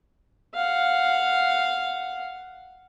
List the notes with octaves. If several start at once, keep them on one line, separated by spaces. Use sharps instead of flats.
F5 F#5